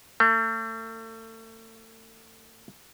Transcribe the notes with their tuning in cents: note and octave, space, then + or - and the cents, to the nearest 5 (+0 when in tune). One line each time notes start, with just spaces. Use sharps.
A3 +35